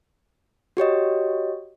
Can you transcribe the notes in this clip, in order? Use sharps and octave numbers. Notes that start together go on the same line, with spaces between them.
F#4 G4 C#5 D#5